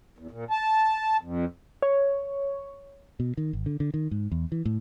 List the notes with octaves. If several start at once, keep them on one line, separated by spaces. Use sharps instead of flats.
E2
A#2
A5
F2
C#5
B2
D#3
G#1
D3
D3
D#3
G#2
E2
E3
A2